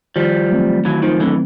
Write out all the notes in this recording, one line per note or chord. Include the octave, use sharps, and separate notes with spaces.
D#3 F3 G3
F#3 A3 C4
D#3 E3 F#3
D#3 F3
D3 E3 F#3 A3 C4